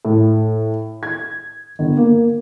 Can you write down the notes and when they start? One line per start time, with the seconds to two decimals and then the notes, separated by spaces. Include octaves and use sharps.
0.05 A2
1.03 G#6
1.79 G1
1.97 A#3